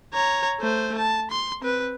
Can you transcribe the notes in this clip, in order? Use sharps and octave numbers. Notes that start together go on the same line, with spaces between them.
C#5 A#5
A3 C5
A5
C6
C4 B4